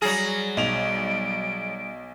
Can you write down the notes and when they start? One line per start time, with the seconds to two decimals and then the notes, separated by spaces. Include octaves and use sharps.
0.02 F#3 G3 G#4 A#6
0.57 B1 D7 F7